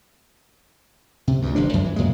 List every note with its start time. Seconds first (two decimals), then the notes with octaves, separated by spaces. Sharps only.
1.27 C3
1.42 D2 G2
1.55 G1 C3 F3 D4
1.74 F#2 F3 G3 G#3
1.85 E3
1.96 F#2 A#2 C#3 G#3